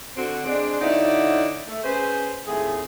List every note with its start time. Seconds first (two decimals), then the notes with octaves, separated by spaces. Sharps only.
0.16 D3 C4 F#4
0.46 G#3 C4 D4
0.81 D3 D#4 E4 F#4 C#5 D5
1.68 A3
1.83 C#4 G#4 B4 C5
2.46 D#2 A2 C4 G#4